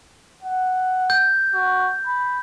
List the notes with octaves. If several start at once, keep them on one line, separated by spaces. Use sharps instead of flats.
F#5
G6
F#4
B5